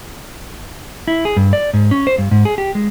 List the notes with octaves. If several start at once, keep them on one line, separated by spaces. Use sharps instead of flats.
E4
G#4
G2
D5
G#2
C#4
C5
G2
G#2
G#4
G4
G#3